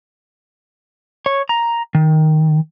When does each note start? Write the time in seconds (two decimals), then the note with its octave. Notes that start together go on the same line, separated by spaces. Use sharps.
1.26 C#5
1.49 A#5
1.95 D#3